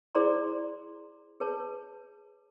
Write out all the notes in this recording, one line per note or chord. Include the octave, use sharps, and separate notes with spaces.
E4 G#4 C5 D5 A#5 C6
G#4 B4 C#5 A5